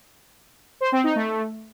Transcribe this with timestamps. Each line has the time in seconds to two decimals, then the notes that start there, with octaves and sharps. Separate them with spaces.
0.81 C5
0.92 C4
1.04 D#4
1.15 A3